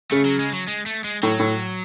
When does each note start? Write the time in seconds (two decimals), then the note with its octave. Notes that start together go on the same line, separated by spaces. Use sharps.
0.11 C#3 A3
0.25 F#3
0.39 G#3
0.53 F#3
0.68 G#3
0.86 A3
1.04 G#3
1.23 A2 F#3
1.39 A2